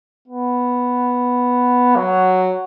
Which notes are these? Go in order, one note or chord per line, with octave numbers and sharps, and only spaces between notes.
B3
F#3